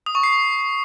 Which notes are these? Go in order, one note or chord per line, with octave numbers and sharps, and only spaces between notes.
D#6
C#6
C7